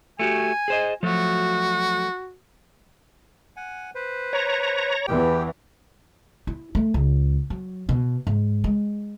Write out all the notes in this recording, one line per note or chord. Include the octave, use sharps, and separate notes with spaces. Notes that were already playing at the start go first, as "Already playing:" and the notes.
A3 F#4 G4 G#5
G#4 C5 D#5
F3 F#3 A3 F#4
F#5 G#5
B4 C5
C#5 A#5
E2 E3 G4 G5
E4
A3
C#2
F#3
B2
G#2
G#3